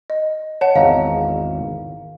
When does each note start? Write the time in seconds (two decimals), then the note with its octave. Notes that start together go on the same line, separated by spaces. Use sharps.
0.10 D#5
0.61 C#5 F#5 A5
0.76 G#1 E2 D#5 F5 A#5